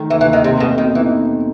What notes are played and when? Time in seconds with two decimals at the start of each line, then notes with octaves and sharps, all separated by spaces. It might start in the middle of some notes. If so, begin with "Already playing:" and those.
Already playing: D#3 A3
0.10 D#2 E3
0.21 E3
0.26 D#2
0.33 D#3
0.44 C3 C4
0.60 B2 A3
0.77 B2 D#3
0.95 E3 D#4